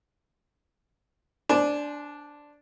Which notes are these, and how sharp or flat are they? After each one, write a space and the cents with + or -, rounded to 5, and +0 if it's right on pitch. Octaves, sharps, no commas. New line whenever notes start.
D4 -5 C5 +0 G#5 +35